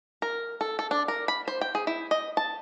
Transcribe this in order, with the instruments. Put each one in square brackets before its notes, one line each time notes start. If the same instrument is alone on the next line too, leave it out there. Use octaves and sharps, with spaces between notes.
[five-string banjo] A#4
A4
A4
D4
A#4
B5
C5
G5
G#4
E4
D#5
A5